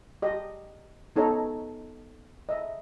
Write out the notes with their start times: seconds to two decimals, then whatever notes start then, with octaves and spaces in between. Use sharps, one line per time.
0.22 G4 D#5
1.16 B3 D#4 A4 C#5 A#5
2.49 D#5 E5